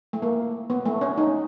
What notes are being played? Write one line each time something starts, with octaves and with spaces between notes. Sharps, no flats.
A3
A#3
B3
A3
C#4
D#4